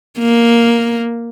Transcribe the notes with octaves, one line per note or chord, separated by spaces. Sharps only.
A#3